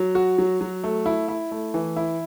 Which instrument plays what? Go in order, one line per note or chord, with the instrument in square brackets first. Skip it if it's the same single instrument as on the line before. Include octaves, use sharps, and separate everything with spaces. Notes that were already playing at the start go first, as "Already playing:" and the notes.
Already playing: [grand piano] F#3
F#4
F#3
F#3
A3
E4
E4
A3
E3
E4